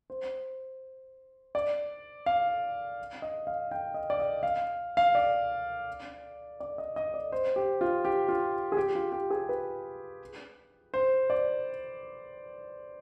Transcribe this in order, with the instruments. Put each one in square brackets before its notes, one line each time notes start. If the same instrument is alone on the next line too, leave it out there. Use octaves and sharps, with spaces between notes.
[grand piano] C5
D5
F5
D#5
F5
G5
D#5
D5
D#5
F5
F5
D5
D5
D#5
D#5
D5
C5
G4
F4
G4
F4
G#4
G4
F4
G4
G#4
B4
C5
D5